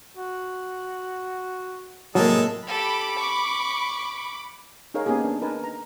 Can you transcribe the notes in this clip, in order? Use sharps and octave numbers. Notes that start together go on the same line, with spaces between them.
F#4
A2 C3 F#3 G#3 A#3 A4
G4 A4 B5 D6
C#6
D#4 G#4 A#4 C#5 F5
A#3 B3 C#4 D#4 G4 G#4
D4
D#4 A#4 B4 G#5 A5
A#5